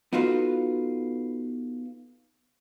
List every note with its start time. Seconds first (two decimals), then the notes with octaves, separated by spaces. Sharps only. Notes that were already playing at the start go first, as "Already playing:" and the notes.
0.13 B3 D#4 F4 F#4 A4 B4